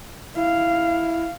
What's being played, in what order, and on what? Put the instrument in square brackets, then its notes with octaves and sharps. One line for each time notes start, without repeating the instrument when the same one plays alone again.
[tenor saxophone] E4 [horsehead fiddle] F5